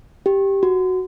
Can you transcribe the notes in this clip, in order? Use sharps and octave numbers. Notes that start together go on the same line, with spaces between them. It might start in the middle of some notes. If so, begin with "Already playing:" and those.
G4
F#4